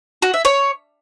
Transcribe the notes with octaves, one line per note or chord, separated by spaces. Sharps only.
F#4
E5
C#5